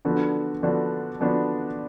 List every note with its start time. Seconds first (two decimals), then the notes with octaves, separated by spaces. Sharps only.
0.05 D3 F3 B3 D4 F#4
0.63 D3 F3 B3 D4 F#4
1.20 D3 F3 B3 D4 F#4